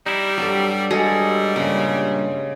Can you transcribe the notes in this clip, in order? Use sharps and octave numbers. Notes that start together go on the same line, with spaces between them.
G3 D#4 E4
G2 F#3 G4 A4
G3 G#3 F#4 G#4 A4 D#5 C#7
G2 A#2 C#3